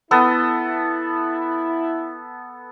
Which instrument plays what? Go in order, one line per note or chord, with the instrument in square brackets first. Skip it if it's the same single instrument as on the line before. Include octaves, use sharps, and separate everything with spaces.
[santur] B3 A4 [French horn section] E4